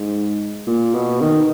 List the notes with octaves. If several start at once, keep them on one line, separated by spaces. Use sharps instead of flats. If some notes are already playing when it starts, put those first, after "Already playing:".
Already playing: G#2
A#2
B2
D#3